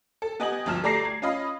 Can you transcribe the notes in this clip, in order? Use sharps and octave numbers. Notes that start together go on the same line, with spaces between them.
A4
B3 G4 D#5 G#5 G#6 F#7
G1 D2 F3 F6 E7
A3 G4 D5 A#5 A#6 C7
G#6
C#4 F4 D#5 F5 B5